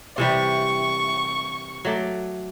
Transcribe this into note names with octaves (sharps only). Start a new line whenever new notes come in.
C3 E3 G3 C#6
F#3 A3 D5